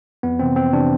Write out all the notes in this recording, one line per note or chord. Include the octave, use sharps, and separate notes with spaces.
F2 B3
C3 E3 C4
F2 C4
C3 E3 D4